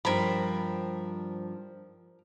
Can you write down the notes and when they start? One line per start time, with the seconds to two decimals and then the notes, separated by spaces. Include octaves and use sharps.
0.05 G2 F3 A#4 C5 B5